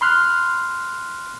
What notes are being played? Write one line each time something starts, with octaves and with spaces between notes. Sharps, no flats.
B5 C6 F6 F#6